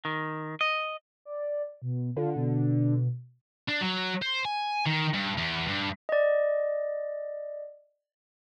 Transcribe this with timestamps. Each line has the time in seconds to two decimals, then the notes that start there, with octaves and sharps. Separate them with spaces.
0.05 D#3
0.61 D#5
1.25 D5
1.82 B2
2.16 D3 F4
2.36 B2
3.68 D4
3.81 F#3
4.22 C5
4.45 G#5
4.87 D#3
5.14 G2
5.38 E2
5.67 G2
6.09 D5 D#5